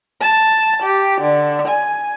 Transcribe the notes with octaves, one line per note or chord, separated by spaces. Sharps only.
A5
G4
D3
G#5